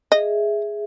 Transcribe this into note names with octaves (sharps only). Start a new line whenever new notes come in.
G#4 D#5 E5